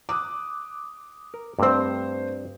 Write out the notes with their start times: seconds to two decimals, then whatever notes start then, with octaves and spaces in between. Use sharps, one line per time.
0.09 D6 D#6 F#6
1.34 A#4
1.59 G2 A3 C4 C5